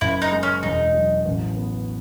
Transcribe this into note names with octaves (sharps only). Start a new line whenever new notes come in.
F#1 E4
D#4
G#3
C#4
E1 D#4
F#3
A1
B3